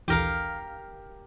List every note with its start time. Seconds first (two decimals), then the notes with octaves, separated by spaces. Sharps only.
0.08 A#1 D#2 E3 G4 A#4 F5